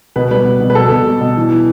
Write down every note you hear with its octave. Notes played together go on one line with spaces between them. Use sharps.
B2 B4
G3 B4
B2
B2
B4
B2 A4
B2
G3
B2
E3
E3